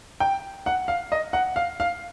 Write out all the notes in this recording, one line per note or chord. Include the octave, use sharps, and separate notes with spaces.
G5
F#5
F5
D#5
F#5
F5
F5